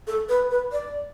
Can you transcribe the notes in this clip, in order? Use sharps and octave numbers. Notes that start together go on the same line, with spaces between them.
A4
B4
B4
D5